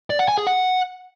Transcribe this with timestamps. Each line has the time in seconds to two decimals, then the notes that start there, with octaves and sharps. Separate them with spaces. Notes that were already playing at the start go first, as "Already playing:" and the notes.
0.10 D5
0.19 F#5
0.28 G#5
0.38 G#4
0.47 F#5